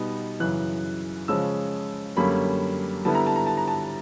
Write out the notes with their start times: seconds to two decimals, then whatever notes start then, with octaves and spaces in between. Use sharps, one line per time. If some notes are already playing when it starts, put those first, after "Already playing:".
Already playing: B2 G3 B3 D#4
0.40 F#2 C#3 E3 F#6
1.28 C#3 F3 G#3 C#4 E6
2.16 F#2 D3 G3 A#3 C#4 B5
3.05 D3 G3 B3 E4 A5
3.15 A#5
3.26 A5
3.36 A#5
3.47 A5
3.57 A#5
3.68 A5